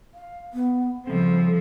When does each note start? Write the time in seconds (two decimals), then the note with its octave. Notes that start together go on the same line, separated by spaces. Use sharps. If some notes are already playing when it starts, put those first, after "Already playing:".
0.14 F5
0.53 B3
1.07 C#3 F3 G3 C4 A4